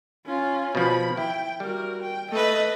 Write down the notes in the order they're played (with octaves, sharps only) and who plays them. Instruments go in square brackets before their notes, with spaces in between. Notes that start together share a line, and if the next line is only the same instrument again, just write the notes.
[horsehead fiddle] C#4 F4
[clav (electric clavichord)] B2 F3 [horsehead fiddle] B5
[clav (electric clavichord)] E4 [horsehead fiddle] G5
[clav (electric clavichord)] G3 [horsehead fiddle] F#4 A#4
[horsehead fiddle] G5
[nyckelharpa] A3 B4 [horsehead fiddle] D#5